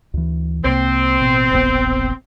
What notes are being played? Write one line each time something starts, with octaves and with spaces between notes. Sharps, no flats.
D2 E3
C2 C3 A#3 C4
A1 B2
E1 A#1 B3